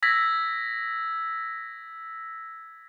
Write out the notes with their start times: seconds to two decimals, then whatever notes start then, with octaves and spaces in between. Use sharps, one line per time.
0.03 E6 G#6 A#6 B6